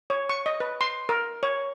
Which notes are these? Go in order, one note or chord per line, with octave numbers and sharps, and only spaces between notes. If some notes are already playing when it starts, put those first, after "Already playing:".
C#5
C#6
D#5
B4
C6
A#4
C#5